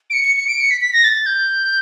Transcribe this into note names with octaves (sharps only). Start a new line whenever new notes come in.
D7
C#7
C#7
C#7
D7
C#7
B6
B6
A#6
A6
G6